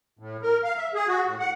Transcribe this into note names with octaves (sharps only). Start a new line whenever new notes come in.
A2
A#4
F5
E5
G#4
F#4
A2
F#5